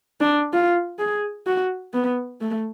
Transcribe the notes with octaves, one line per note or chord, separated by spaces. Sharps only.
D4
F4
G#4
F#4
B3
A3